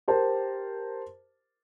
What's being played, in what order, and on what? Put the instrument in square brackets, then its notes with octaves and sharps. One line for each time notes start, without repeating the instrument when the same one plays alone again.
[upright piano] G4 A#4 C5 A5